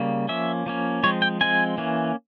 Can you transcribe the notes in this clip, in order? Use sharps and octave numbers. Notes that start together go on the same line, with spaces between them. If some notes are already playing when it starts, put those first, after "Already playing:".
Already playing: C#3 G3 A#3
F3 A#3 C#4 E5
F3 A#3 C#4
F3 G#3 C4 C#5
G5
F3 G#3 C4 G#5
E3 A#3 C#4